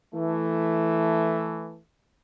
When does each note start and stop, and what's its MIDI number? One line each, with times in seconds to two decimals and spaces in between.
0.14 1.79 52
0.14 1.79 57